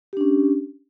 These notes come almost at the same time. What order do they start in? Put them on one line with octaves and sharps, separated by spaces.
G4 D4 C#4